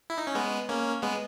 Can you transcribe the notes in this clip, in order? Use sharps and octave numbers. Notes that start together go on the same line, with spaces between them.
E4
D#4
C#4
G#3 B3
A#3 C#4
G#3 B3